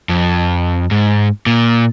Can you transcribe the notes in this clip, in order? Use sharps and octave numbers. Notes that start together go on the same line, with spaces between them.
F2
G#2
A#2